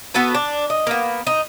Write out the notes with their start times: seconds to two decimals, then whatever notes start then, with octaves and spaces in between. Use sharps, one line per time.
0.14 B3 F#4 A4 B4
0.35 D4
0.70 D#5
0.87 A#3 B3
1.27 D#4